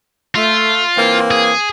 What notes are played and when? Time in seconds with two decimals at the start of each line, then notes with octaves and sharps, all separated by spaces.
0.35 A3 F4
0.96 E3 A#3 C4
1.31 G#4